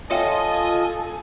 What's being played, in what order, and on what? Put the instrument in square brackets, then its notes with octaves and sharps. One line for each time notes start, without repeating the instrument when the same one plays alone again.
[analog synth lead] F4 [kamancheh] A4 G#5 [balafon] C#5 E5 G5 [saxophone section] D#5